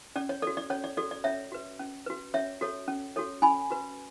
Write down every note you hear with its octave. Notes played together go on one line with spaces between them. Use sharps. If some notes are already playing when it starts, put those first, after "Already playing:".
C#4 D5
C#5
F#4 A4 D5
D5
C#4 C#5
D5
F#4 A4 D5
D5
C#4 C#5 E5
F#4 B4
C#4
F#4 B4
C#4 C#5 E5
F#4 A4 C#5
C#4
F#4 A4 C#5
C#4 G#5 B5
F#4 B4